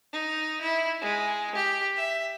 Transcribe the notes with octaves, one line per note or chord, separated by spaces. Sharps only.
D#4
E4
G#3
G4
E5